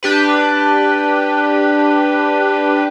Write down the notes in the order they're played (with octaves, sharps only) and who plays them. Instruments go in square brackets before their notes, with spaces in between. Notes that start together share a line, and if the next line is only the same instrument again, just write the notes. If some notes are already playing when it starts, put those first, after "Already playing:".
[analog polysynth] D4 G4 B4